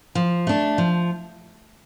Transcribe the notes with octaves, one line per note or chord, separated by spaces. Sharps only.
F3
A3 D4
F3